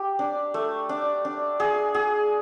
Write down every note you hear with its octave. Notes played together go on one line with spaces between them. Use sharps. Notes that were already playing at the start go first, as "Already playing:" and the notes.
Already playing: G4
D4
A3
D4
D4
G#4
G#4